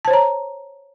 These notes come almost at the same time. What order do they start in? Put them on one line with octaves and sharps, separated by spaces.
A5 C5 C#5 A#5